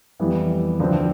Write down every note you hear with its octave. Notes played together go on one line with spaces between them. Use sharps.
F2 E3 G3 B3 E4
D2 D3 F3 C4